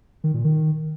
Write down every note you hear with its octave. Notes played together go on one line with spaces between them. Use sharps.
D#3
A#2
D#3